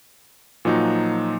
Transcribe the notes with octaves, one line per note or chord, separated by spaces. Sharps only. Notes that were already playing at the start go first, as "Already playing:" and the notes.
A#2 F3 F#3 D#4 F#4